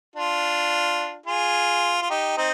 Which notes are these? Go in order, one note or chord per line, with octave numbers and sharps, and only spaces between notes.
D4 F4
F4 G#4
F4
D#4 G4
C4 D#4